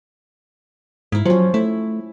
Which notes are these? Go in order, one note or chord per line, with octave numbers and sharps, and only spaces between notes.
G#2 E4 F5
F3 F#3 C#4
A3 E4